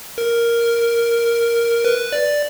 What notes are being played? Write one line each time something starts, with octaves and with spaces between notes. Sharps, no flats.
A#4
B4
D5